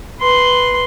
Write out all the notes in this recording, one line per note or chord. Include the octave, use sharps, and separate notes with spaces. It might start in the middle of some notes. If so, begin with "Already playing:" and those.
B4 C6